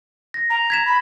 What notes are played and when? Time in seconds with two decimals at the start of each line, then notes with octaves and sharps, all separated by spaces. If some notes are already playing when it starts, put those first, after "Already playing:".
0.34 A#6
0.49 A#5
0.70 G#6 B6 E7
0.85 B5